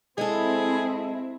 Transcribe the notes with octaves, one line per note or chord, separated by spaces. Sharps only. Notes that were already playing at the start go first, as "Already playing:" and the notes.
G#3 C4 E4 G#4 A4